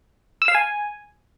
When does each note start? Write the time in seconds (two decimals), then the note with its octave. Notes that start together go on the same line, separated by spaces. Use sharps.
0.42 E6
0.48 F5
0.55 G#5